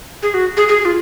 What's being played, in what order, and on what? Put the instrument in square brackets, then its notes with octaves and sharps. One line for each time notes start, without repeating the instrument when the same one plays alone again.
[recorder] G#4
F#4
G#4
G#4
F4